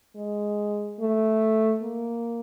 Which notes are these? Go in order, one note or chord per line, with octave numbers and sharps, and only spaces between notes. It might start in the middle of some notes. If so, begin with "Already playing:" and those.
G#3
A3
A#3